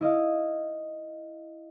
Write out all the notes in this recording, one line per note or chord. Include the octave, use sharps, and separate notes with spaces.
E4 D#5 F5